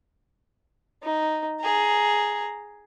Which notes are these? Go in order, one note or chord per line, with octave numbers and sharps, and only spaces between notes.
D#4
G#4 A#5